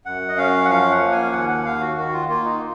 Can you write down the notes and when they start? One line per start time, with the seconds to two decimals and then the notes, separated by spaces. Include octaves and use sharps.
0.05 F#2 F#5
0.28 D#5
0.37 C#4 F5
0.65 F#5
0.69 F3 F5
0.91 F#5
1.01 A#3
1.12 G#5
1.33 D#2 F#5
1.49 F#5
1.65 D#2 F5
1.81 F#4
1.97 D#3 F#4
2.13 F4
2.29 A#3 F4
2.45 D#4